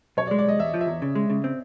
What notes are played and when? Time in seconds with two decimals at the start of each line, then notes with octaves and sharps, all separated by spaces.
0.17 B1 C#5
0.27 D5
0.31 G#3
0.39 D5
0.45 B1 D#5
0.59 E2 E5
0.74 F3
0.81 E5
0.87 E2
1.02 C#3
1.15 G#3
1.30 C#3
1.44 C4